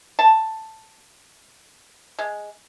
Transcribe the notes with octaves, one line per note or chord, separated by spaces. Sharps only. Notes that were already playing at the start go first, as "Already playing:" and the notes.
A5
G#3